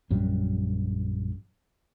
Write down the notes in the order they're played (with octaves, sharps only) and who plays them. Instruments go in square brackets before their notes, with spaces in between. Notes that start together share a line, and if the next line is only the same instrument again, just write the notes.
[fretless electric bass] A#1 F#2 F#3 G3